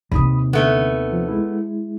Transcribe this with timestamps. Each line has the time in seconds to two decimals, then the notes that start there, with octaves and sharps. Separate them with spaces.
0.12 D#2 C3 B5 D#6
0.53 D3 A3 B3
1.12 F3
1.28 G#3 E4